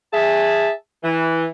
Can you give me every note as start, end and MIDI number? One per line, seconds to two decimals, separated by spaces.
0.13 0.70 68
0.13 0.70 76
0.13 0.70 81
1.04 1.46 52